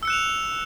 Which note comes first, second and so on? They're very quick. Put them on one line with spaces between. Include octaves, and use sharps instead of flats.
E6 C#7 F#6 E7 F7